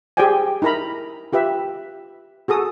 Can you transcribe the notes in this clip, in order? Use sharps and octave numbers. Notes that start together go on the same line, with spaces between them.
G4 G#4 C5 D5 G5 G#5
D#4 E4 A#4 A#5 B5
F4 G4 B4 E5
F#4 G#4 A4 D#6